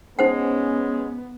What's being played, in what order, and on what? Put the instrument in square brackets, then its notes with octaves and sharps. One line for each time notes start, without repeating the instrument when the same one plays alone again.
[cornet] G#3 [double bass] B3 [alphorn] C#4 [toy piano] D#4 C5 F#5